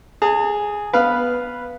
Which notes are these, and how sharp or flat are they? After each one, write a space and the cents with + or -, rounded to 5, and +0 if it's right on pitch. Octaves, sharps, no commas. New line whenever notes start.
G#4 +0 A5 +45
B3 +0 B4 -5 F5 -5